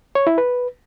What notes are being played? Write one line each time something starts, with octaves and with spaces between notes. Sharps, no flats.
C#5
E4
B4